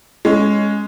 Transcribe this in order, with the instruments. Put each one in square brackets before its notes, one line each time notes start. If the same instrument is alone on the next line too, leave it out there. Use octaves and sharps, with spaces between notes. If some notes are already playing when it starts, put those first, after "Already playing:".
[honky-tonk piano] G#3 C#4